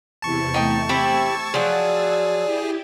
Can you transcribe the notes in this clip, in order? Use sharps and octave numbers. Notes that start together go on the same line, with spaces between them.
E2 C3 E4 A5 C#6
A3 D#4 G5
C4 E4 G4 E6 G#6 A6
F3 F#3 G#4 D5
E4 G4